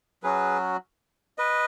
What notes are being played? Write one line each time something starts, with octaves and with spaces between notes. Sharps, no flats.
F#3 C#4 F#4 G#4 B4
B4 D#5